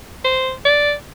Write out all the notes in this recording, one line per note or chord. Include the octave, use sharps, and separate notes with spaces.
C5
D5